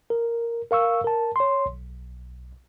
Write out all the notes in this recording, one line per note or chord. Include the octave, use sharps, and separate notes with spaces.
A#4
A#4 F5 C#6 E6
A#4 A5
C#5 C6
B1